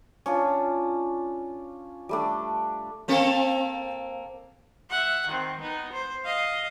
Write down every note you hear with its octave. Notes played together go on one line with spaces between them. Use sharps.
C#4 D4 F4
G3 A3 D4
A#3 C4 A4
E5 F#5
D#3 C4
B3 D#4
C5
D#5 F5